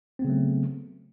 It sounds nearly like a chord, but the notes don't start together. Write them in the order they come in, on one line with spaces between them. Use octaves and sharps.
C4 B3 C#3 F#3 A3